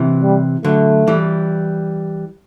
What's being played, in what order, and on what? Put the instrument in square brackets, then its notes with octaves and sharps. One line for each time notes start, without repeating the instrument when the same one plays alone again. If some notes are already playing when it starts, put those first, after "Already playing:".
Already playing: [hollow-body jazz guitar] C3 E3
[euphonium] G3
[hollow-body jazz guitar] D3 F#3 [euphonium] A3
[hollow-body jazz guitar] E3 G3